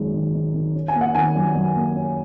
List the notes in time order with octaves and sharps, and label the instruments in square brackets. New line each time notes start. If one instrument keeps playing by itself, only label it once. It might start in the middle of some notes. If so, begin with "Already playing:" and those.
Already playing: [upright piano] G#1 F#2 D#3 G#3
D#3
D#3
D#3
C#4
G#5
A#3
F#5
D#3 G#5
F#2
F#2
A#3
C#4